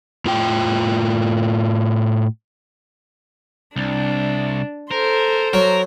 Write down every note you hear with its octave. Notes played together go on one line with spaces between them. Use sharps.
A2 F4 G5
C2 D4
A4 A#4 C5
F#3 A#4